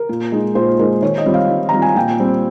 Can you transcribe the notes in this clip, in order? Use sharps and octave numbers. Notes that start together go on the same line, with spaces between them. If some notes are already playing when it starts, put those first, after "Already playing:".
Already playing: A#4
A#2
G#3 D#4
A#2 C5
G#3 D#4 A#4
D#3 C#5
D#5
G3 C4 F4
F5
D#3
G3 C4 F4 A#5
G#5
A#2 G5
G3 C4